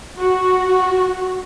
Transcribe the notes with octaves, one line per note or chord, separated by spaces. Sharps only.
F#4